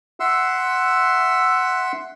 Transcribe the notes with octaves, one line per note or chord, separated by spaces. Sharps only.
E5 F#5 C6 E6